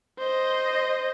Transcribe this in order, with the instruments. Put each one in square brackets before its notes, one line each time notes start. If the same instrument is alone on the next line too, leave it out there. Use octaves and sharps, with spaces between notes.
[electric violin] C5 D#5